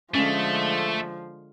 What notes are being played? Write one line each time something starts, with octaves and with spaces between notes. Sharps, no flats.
D3 F3 G#3 A3 C#4 F5